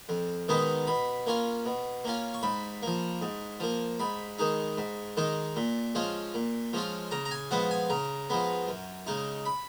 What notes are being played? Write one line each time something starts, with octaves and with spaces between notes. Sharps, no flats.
F2
D#3 G#3 B3 D#4
B2 B5
A#3 C#4 F4
B2
A#3 C#4 F4
C#6
G#2 B5
F3 A#3
G#2
F3 A#3
G#2 B5
D#3 G#3 D#4
G#2
D#3 G#3 D#4
A#2
F3 G#3 C#4 F4
A#2
F3 G#3 C#4 F4
C#3 A#5
A#5
G#5
F3 G#3 B3 F#5
G#5
C#3 A#5
F3 G#3 B3
F#2
C#3 G#3 D#4
B5